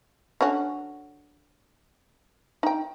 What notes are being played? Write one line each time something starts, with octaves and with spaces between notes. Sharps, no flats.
D3 C#4 F#4
D#4 G5